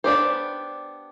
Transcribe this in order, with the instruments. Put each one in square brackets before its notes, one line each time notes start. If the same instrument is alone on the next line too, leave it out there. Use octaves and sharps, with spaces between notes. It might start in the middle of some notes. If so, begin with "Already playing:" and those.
[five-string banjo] B3 D4 G4 C5